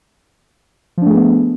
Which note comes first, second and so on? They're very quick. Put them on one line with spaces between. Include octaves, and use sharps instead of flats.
F3 D4 A3 G#4 B3